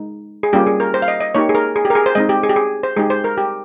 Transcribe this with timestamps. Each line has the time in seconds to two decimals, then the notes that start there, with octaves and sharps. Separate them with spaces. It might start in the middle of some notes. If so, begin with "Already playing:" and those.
Already playing: G#3 D#4
0.43 G#4
0.53 G3 A#3 C#4 F4 G4
0.67 G#4
0.80 A#4
0.94 C5
1.02 F5
1.08 D#5
1.21 D#5
1.34 A#3 D#4 G4 C#5
1.49 G#4
1.55 A#4
1.76 G#4
1.85 G4
1.90 A#4
1.95 G#4
2.06 C5
2.15 G#3 C4 D#4 D#5
2.29 G4
2.43 G#4
2.49 G4
2.56 G#4
2.83 C5
2.96 G#3 D#4 G4 G#4
3.10 C5
3.24 A#4
3.38 G4